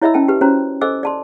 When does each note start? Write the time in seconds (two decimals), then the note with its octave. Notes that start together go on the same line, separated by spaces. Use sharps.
0.02 E4 C#5 D#5 E5 B5 E6
0.14 C#4 A#4 G5 A5
0.28 G4 B4
0.41 C#4 F#4 C5 C#5 A#5
0.81 A4 C5 D#5 G#5 D6 E6
1.03 D5 A5 C6